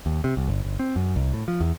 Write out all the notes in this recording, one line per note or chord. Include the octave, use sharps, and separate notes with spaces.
D#2
C3
C2
G1
G1
C4
F#2
C2
A2
F3
E2